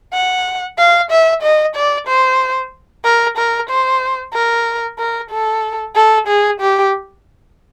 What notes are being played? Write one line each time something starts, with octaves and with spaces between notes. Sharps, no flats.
F#5
F5
E5
D#5
D5
C5
A#4
A#4
C5
A#4
A#4
A4
A4
G#4
G4